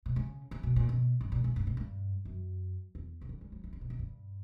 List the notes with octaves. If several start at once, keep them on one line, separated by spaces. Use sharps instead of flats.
B2
C#3
C#3
B2
A#2
B2
G2
A#2
A#2
G2
A#2
G2
F#2
E2
C#3
D3
G3
F#3
E3
D3
B2
A#2
G2